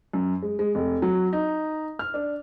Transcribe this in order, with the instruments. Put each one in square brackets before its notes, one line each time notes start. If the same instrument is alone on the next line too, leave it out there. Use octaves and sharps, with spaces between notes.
[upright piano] F#2
G#3
G#3
F1
F#3
D#4
F6
D4